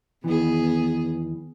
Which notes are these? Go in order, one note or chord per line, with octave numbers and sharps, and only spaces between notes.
E2 D#3 E3 B3 G#4